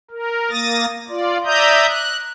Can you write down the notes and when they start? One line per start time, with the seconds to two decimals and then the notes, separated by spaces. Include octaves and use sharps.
0.11 A#4
0.50 A#3 D#6 A6 A#6
1.09 F4 D5
1.45 D5 E5 A#5 D#6 G6
1.88 F#6